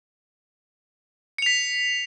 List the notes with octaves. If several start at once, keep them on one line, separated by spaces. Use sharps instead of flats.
B6 C#7 F7